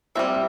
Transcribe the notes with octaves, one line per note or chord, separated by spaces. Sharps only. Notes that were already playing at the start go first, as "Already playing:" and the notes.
G3 C4 E4 E5